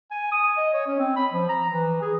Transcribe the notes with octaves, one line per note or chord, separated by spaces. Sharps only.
G#5
D#6
D#5
C#5
C#4
C4
B5
F3
A#5
E3
G#4